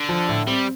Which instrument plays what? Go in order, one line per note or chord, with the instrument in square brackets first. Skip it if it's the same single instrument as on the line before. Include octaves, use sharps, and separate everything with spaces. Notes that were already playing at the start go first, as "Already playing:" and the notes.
Already playing: [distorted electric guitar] D3
[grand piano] F3
A2
[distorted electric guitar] G3 [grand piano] C4